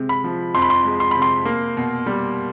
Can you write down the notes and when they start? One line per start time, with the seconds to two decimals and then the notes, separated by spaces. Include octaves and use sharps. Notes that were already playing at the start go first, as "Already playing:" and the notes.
Already playing: C3 G#3
0.09 B5
0.24 F3
0.55 F2 C6
0.62 B5
0.70 C6
0.85 G#3
1.00 C6
1.11 C3 B5
1.22 C6
1.45 A#3
1.77 B2
2.06 G3